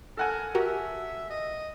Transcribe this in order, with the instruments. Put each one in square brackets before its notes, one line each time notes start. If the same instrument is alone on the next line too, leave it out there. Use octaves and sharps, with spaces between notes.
[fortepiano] A4 F#5 G#5 [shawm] A#4
[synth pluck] F#4 G4 A#4 [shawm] E5
[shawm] D#5